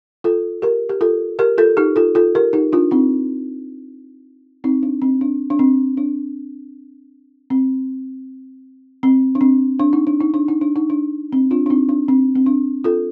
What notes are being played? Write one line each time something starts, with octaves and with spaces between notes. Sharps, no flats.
F4 A4
G4 A#4
G4
F4 A4
G4 A#4
F4 A4
D#4 G4
F4 A4
F4 A4
G4 A#4
D#4 G4
D4 F4
C4 D#4
C4 D#4
D4
C4
D4
D4
C4
D4
C4
C4
D4
C4
D4
D#4
D4
D#4
D4
D#4
D4
D#4
D4
C4
D4 F4
D4
C4 D#4
D4
C4
C4
D4
F4 A4